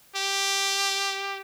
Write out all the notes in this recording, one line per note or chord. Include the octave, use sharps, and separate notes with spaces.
G4